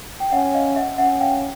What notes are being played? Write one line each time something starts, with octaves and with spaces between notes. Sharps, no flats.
G5
C#4 E5 F#5
D#5 F5
E5 F#5
C#4 E5 F#5
F5 G5